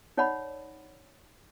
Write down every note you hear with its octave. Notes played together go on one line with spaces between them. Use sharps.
D#4 C#5 D5 F#5 B5